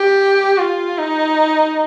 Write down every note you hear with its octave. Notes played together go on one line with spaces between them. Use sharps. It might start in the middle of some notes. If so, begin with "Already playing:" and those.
Already playing: G4
F4
D#4